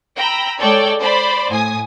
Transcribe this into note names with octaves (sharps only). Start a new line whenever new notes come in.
G5 A#5 B5 E6
G#3 A4 C#5 D5 G5
C5 D5 B5
A2 G#5 D#6